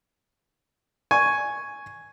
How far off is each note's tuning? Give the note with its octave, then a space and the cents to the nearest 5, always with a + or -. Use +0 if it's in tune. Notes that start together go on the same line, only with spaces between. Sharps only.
G#5 +0 C#6 +0